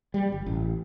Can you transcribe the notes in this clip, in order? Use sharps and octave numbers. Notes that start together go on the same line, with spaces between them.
G3
G1
A1